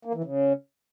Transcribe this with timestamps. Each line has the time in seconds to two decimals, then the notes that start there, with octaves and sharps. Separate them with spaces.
0.05 A#3
0.15 E3
0.24 C#3